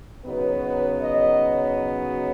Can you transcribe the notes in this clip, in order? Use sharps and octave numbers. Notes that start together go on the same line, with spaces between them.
C#3 F#3 B3 D#4 B4
B4
D#5